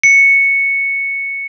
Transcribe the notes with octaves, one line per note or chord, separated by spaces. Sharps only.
C#7